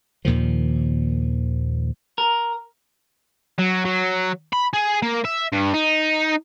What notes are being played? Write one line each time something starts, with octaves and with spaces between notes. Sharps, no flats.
D#2 A#2 D#3 F3
A#4
F#3
F#3
B5
G#4
A#3
E5
G2
D#4